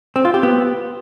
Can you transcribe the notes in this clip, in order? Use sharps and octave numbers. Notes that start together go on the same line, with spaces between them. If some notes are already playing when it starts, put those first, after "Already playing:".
C4
F4
G4
B3